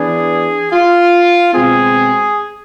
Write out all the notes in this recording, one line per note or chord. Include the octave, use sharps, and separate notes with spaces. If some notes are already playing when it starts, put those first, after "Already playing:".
Already playing: E3 B3 D4 G#4
F4
B2 G#3 C4 G#4